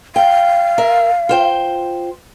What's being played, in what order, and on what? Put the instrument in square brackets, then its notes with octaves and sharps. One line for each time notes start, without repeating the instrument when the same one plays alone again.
[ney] F5 [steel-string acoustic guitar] G5
[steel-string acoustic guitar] A#4 E5
F4 C5 G5